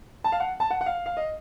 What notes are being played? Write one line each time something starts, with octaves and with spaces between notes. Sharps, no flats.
A5
F5
F#5
A5
F#5
F#5
F5
F5
D#5